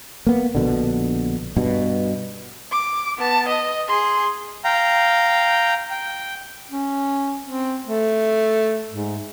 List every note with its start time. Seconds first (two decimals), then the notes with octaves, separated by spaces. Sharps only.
0.27 A#3 B3
0.55 A#1 B2 D3
1.57 G2 B2
2.71 D6
3.18 B3 A5
3.48 D#5
3.88 G#4 C6
4.64 F5 G5 A#5
5.91 G5
6.71 C#4
7.44 C4
7.86 A3
8.91 G#2